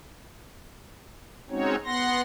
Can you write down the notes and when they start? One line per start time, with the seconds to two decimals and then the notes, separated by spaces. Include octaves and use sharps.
1.50 G#3 C4 C#4 D#4 F#4 C#5
1.85 B3 F#5 C6 A#6